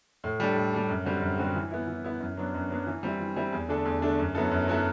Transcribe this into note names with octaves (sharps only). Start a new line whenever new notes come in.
A2
G3 D4 A4
A2
G3 D4 A4
F#2
D3 G3 C4 F#4
F#2
D3 G3 C4 F#4
E3
B3 E4
E3
B3 E4
F#2
F#3 B3 D4
F#2
F#3 B3 D4
E3
G3 C4 E4
E3
G3 C4 E4
E2
D3 A3 D4 A4
E2
D3 A3 D4 A4
F#2
F#3 B3 E4 A4
F#2
F#3 B3 E4 A4